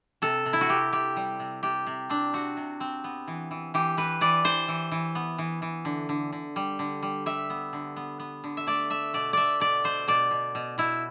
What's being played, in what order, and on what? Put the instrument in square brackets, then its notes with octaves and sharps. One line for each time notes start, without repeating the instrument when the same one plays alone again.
[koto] C3 A4
C3
E4
F#4
C3 G4
C3 G4
G3
C3
C3 G4
C3
C4 D4
C4 F#4
C3
C4
B3
E3
E3
E3 G4
E3 B4
E3 D5
E3 C5
E3
E3
B3
E3
E3
D3
D3
D3
G3
D3
G3
G3 E5
B3
D3
B3
B3
D3
E5
A3 D5
A3 E5
B2 D5
A3 D5 E5
B2 D5
B2 C5
B2 D5
B2
B2
B2 E4